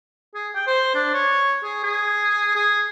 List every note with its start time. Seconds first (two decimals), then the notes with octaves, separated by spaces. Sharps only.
0.35 G#4
0.55 G5
0.67 C5
0.95 D4
1.14 C#5
1.64 G#4
1.83 G#4
2.56 G#4